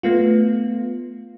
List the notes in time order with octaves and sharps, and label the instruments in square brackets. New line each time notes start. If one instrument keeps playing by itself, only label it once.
[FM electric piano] A3 B3 F4